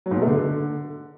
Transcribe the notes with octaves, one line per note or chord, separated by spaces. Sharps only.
F#3
G#2
B2
A3
D3